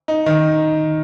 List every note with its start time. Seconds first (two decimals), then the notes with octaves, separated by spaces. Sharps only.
0.08 D#4
0.26 D#3